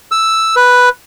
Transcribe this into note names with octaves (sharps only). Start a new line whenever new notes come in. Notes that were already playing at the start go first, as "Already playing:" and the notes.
E6
B4